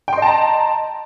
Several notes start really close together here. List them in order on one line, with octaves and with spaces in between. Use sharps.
G5 C6 D#5 A5 A#5